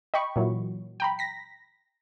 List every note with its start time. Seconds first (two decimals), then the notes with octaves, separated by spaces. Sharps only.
0.14 D#5 G5 B5 C#6
0.36 A#2 E3 F#3
1.00 G5 A#5 B5
1.19 A#6 B6